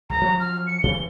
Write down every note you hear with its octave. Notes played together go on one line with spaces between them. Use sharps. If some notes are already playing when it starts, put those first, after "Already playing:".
C#2 F#2 C#3 A#5
F3 F#3 C#4
F6
C#7
C3 E3 G7